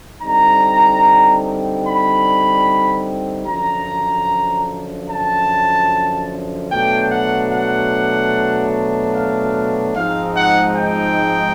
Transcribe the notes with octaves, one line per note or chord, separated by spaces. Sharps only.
D3 G3 C4 D#4 A#5
B5
F#2 D3 F3 A#5
A5
B2 F#3 A3 D4 G5
F#5
F#5
F5
G#2 F3 G#3 C4 D#4 F5
F#5
G5